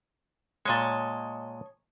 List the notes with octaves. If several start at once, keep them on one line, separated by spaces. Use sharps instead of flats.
A#2 G#3 C#5 D#5 A5